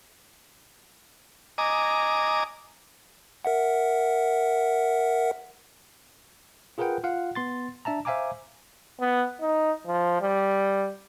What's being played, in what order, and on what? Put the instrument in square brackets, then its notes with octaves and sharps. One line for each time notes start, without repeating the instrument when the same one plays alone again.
[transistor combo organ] D#5 G#5 A#5 D6
[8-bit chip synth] A#4 E5 F#5
[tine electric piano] F4 G#4 A#4 B4 F#5 G5
F4 F5 F#5
B3 C6 A6
D4 E5 A5 A#5
C5 E5 F5 G#5 A#5 D6
[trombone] B3
D#4
F3
G3